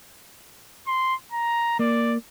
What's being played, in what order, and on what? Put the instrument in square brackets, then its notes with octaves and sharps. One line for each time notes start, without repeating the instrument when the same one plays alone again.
[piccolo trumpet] C6
A#5
[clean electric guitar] A#3 [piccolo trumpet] D5